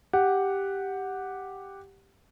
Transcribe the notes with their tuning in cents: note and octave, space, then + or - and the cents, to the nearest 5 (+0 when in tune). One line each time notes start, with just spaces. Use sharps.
G4 +0 F#5 +0